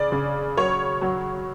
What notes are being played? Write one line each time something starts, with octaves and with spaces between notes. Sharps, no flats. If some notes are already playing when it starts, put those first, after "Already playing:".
Already playing: C#3 D5
C#3
F#3 C#5
F#3